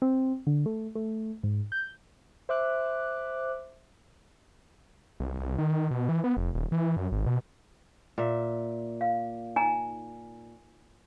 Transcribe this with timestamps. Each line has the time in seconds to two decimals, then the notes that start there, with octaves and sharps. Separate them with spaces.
0.02 C4
0.47 D3
0.66 A3
0.95 A3
1.43 G#2
1.72 G6
2.49 C5 E5 D6 F#6
5.20 C2
5.39 C2
5.58 D#3
5.91 B2
6.09 E3
6.24 B3
6.37 F1
6.55 D#1
6.72 E3
6.97 F#2
7.12 G#1
7.26 B2
8.18 A#2 E5
9.01 F5
9.56 D#4 G#5 A#5